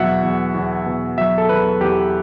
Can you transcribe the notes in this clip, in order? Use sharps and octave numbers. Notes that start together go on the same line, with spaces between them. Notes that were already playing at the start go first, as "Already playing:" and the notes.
Already playing: E2 B2 F#3 E5 F#5
E2
E2
B2
F#3 E5
A4
E2 B4
E2 G4